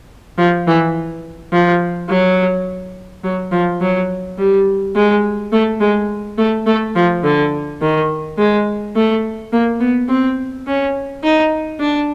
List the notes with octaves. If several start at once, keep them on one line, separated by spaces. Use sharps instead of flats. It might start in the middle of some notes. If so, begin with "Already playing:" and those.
F3
E3
F3
F#3
F#3
F3
F#3
G3
G#3
A3
G#3
A3
A3
F3
D3
D#3
G#3
A3
A#3
B3
C4
C#4
D#4
D4